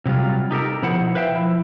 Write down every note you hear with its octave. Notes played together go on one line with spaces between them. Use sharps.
C3 F#3 G3 F4
D#4 G4 A4 A#4
B2 F3 E4 C5 F#5
B4 C5 E5 F5 G5
F3 E4